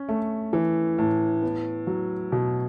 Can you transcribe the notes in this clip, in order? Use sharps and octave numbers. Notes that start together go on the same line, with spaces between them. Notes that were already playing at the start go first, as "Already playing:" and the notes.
Already playing: C#4
A3
E3
A2
B3
F#3
B2